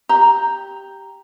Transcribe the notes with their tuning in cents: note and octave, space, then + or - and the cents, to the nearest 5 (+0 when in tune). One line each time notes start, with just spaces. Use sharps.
G4 +0 A#5 +0